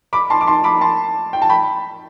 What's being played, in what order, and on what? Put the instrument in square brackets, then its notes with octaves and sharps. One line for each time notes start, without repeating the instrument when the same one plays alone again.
[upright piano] B5 D6
A5 C6
D6
A5 C6
B5 D6
A5 C6
G5
A5
G5 B5